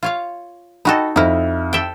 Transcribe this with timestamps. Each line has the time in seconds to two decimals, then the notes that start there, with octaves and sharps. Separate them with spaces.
0.03 F4 C#5 F5
0.85 D#4 F#4 A4 D#5 G5 B5
1.16 F2 D#4 E4 F6
1.73 A4 E5 G5